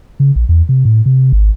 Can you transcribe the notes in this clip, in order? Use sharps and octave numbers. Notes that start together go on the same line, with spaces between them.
C#3
A#1
E2
C3
A2
C3
G#1